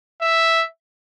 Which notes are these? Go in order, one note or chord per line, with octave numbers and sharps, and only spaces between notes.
E5